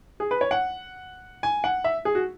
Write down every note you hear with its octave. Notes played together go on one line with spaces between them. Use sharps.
G#4
B4
C#5
F#5
G#5
F#5
E5
G#4
F#4